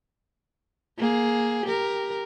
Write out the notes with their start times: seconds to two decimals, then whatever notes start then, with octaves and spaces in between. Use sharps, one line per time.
0.98 A#3 G#4
1.66 G4 A#4